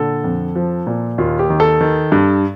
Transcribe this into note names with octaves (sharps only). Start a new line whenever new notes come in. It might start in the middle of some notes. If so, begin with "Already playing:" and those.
Already playing: A#2 D3 A4
F2
F3
A#2
D#2 F4
G4
D#3
A4
D#3
G2